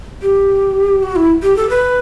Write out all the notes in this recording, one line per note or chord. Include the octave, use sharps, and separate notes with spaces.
G4
F#4
E4
G4
A4
B4